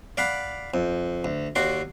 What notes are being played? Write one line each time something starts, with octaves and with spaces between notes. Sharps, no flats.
D5 F5 F#5 B5
F2
D2
D#2 F#4 D5 C6